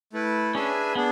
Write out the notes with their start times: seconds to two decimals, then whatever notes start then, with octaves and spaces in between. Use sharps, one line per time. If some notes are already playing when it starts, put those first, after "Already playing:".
0.13 A3 E4 B4
0.54 C#4 D4 G#4 B4 E5 G#5
0.95 B3 D4 G#4